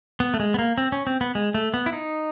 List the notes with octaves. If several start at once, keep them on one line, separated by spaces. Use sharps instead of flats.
B3
A3
G#3
B3
A#3
C4
C#4
C4
B3
G#3
A3
B3
E4
D#4